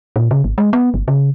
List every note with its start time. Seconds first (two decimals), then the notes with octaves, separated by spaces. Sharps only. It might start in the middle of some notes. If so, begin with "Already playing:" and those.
0.16 A#2
0.31 C#3
0.44 G#1
0.58 G#3
0.73 B3
0.94 G1
1.08 C#3